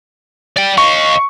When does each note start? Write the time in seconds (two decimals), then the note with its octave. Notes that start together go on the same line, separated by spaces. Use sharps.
0.57 D5 G5
0.78 D#5 F5 C#6